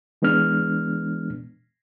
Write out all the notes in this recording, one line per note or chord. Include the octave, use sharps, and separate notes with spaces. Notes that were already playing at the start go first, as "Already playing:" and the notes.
E3 G#3 B3 D4 F6